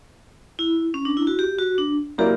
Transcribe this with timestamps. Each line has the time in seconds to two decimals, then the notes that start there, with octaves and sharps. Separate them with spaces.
0.59 E4
0.94 C#4
1.05 D4
1.17 E4
1.27 F#4
1.39 G4
1.58 F#4
1.78 D4
2.18 F#3 A#3 E4 G4 A#4 D5